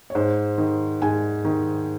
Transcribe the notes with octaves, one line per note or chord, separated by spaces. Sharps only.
C#5
G#2 C5
D#3
G#2 G#5
D#3